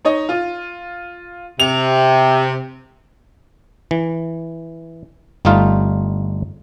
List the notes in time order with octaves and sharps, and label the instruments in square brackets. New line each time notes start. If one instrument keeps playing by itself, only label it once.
[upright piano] D#4 C#5 D#5
F4
[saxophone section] C3 [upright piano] F7
[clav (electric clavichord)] E3
G1 G3 A3 D#4 F4 F5